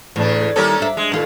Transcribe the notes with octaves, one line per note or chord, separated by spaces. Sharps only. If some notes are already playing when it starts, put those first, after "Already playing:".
E2 A2 C#3 D4
D#3 G3 A#3 C#4 E4 A4
D4 E5
G#3
F#2 A#2 D#3 F4 A4